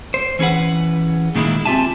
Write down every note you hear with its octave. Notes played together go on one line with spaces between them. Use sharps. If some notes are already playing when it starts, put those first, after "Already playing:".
C5
E3 C#4 G#4 B4 F#5
A#2 D#3 G#3 A#3 E4
C4 F4 G4 E5 G#5 A5